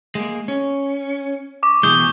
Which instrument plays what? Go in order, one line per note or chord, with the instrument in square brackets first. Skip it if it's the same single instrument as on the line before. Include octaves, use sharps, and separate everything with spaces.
[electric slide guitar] G#3 A#3
C#4
[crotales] C#6 D6
[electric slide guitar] B2 E3 G#3 [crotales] D#6 G6 G7